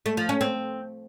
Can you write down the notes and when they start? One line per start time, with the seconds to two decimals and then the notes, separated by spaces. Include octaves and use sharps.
0.06 A3
0.17 F3
0.29 C#4
0.41 C4